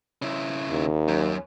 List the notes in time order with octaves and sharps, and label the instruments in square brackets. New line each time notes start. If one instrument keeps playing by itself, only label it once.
[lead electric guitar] C#3 E4
[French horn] D#2
[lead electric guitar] F#2